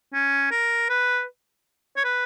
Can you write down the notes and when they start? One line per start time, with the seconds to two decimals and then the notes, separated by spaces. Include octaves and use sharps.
0.13 C#4
0.51 A#4
0.89 B4
1.97 C#5
2.04 B4